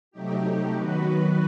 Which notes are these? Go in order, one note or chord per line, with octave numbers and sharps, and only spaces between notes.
C3 F#3 A3 D#4 G4
D#3 F#3 B3 F#4 B4